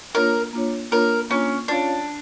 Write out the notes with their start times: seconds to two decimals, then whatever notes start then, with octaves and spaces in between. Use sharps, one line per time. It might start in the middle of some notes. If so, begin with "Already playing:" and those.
0.15 A#3 D4 F4 A#4 C#5
0.53 A#3 D4 F4 C#5
0.92 A#3 D4 F4 A#4 C#5
1.30 A#3 C#4 D4 F4 C#5
1.68 C#4 D4 F4 C#5 F5